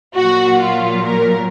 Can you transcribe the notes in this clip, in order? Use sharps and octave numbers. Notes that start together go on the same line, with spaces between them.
A#2 F#3 F#4
F4
A#4